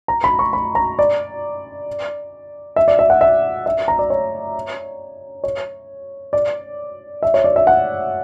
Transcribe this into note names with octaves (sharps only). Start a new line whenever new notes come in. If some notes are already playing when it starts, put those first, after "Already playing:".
A#5
B5
C#6
B5
A#5
D5
E5
D5
E5
F#5
E5
E5
A#5
D5
C#5
C#5
D5
E5
C#5
D5
E5
F#5